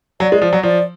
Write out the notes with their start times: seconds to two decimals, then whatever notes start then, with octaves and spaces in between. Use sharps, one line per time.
0.20 F#3 D5
0.32 G#3
0.42 F3
0.53 F#3
0.63 F3 D5